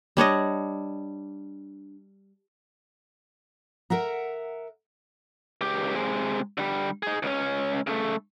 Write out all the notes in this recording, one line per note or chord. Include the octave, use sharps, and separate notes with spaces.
G3 D4 C#5 D#5
A#4 E5 F#5 A#5
C#2 G4
C3 G#3
D3 G3
D#4 G#4
C#2 C#4
C#3 A3